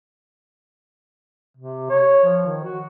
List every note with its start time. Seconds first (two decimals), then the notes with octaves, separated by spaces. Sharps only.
1.57 C3
1.90 C#5
2.24 F3
2.46 D#3
2.63 F#4